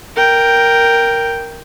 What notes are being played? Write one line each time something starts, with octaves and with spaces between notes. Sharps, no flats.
A#4 G5